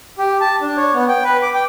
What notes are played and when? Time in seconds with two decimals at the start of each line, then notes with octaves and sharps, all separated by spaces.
0.18 G4
0.41 A5
0.61 D4
0.77 C#5
0.94 B3
1.09 G5
1.24 B4
1.43 D6
1.54 G5